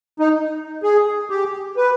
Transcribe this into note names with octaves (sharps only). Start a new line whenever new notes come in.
D#4
G#4
G4
B4